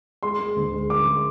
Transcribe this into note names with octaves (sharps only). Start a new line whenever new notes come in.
G#3 C6
G#3
D2
G#3
D2 D6
G#3